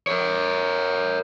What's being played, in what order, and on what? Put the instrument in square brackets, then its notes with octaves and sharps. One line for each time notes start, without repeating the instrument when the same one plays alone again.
[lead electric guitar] A#4 C#5